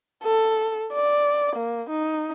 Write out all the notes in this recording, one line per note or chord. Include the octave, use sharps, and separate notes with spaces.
A4
D5
A#3
D#4